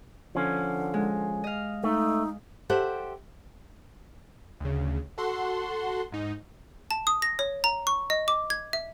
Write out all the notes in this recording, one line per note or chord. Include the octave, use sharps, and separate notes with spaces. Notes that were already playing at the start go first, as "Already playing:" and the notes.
D3 F3 C#4
G#3
D#5 F5
A3 D#4
G4 A4 C5 E5 F#5
D2 C#3
F#4 A4 F#5 C6
G#2 D#4
A5
D#6
A#6
C#5
A#5
C#6
D#5
D6
G#6
E5